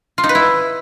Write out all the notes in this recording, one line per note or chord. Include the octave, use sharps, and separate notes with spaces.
F4
D#4
B4
E4